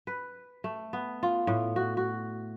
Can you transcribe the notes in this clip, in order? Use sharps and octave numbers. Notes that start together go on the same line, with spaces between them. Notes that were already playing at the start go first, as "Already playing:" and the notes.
B4
A3
B3
F4
A2
F#4
F#4